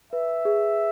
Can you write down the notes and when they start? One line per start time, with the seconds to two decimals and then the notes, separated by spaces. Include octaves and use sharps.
0.12 B4 E5
0.45 G#4